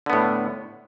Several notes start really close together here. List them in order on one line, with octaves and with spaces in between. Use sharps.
D3 B3 A2